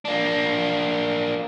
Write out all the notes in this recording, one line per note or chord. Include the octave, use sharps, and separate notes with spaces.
A#3 D4